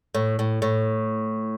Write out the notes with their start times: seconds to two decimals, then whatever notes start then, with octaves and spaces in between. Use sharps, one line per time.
0.15 A2
0.39 A2
0.62 A2